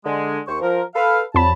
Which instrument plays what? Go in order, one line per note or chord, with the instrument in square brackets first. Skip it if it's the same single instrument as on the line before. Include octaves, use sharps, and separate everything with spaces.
[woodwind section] D3 G#3
D#2 C5 C#6
F3 A#4
A4 B4 F5
[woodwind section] C2 F#3 A5 [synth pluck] F2 B5